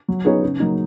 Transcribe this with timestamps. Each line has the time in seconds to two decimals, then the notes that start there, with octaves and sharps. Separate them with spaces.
0.08 F#3
0.25 B3 D#4 G#4 C#5
0.42 C#3
0.60 F#3 A#3 D#4